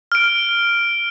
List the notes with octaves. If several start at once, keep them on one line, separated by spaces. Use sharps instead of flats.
F6 D7